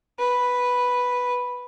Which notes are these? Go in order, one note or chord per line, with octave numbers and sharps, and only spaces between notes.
B4